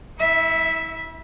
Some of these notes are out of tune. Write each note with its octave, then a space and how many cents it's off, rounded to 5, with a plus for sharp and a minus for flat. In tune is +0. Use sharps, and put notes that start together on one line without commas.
E4 -35 E5 +0